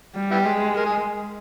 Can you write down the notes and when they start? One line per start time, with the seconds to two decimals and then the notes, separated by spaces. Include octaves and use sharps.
0.16 G3
0.31 B3 E4 G4
0.45 G#3
0.76 A#4
0.85 G#4